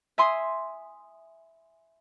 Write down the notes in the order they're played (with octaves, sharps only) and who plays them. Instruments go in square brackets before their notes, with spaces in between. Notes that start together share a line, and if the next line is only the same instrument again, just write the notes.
[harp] E5 G#5 C6 D#6